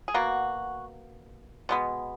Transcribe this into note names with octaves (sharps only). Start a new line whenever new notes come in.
G#4
B2 A#3 F#4
B2 G#3 B3